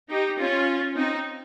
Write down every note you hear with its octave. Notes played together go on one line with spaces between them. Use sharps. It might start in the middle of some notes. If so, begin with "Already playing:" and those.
D#4 G4
C#4 F4
C4 D#4